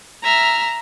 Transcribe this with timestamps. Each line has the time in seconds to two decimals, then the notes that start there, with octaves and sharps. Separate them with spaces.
0.24 E5 A#5 F6